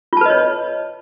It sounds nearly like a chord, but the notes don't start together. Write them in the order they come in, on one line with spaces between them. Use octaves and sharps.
F4 A5 B4 D#5 C#5